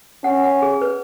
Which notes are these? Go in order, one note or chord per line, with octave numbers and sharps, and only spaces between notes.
C#4 F#5
F#5
G#4
B4